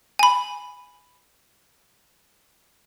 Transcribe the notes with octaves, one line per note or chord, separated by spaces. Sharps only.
G#5 B5